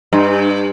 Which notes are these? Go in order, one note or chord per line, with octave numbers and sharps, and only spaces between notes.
G2